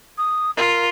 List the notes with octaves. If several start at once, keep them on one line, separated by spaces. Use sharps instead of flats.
D#6
F4 A#4